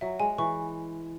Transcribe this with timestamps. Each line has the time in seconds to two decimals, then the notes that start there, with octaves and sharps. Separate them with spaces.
0.01 F#3 E5
0.20 G#3 G#5
0.38 E3 C#6